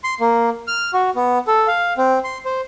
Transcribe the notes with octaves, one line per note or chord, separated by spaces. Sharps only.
C6
A#3
F6
F#4
B3
A4
F5
C4
C6
C5